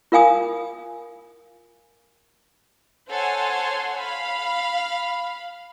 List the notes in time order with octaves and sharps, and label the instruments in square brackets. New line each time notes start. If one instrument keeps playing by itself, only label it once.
[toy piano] F4 A#4 F5 G#5 D#6
[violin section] A4 C5 C#5 F#5 G#5 C6
F5 B5